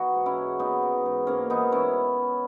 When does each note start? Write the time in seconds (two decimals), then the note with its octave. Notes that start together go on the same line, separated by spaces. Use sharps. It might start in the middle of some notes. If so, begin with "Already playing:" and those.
Already playing: E3 D#4 F#4
0.15 G#2
0.26 C#4 E4
0.37 G#2
0.59 E3 B3 D#4
0.83 E3
1.06 G#2
1.27 G#2 A#3 C#4
1.50 E3 B3 D#4
1.72 E3 C#4 E4